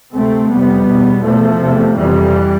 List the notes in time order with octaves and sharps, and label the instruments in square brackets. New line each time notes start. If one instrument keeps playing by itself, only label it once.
[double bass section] D2 C3 A3 C4
F2 C3 G3 B3
E2 B2
E2 B2 F3 A3
E2 C3
F2 C3 E3 G3